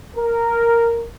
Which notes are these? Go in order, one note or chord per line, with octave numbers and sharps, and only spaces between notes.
A#4